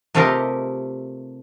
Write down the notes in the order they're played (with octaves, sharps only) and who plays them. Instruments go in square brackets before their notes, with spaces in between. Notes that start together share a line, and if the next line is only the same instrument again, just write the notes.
[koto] C3 A3 F4 G4 A#4 D#5